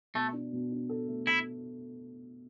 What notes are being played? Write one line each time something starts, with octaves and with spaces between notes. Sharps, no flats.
B2 A3
D4
B2
D4
A4
A3
E4 A4